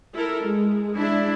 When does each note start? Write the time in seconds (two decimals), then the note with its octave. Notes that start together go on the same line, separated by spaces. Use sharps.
0.14 E4 A4 A#4
0.45 G#3
0.95 D4 E4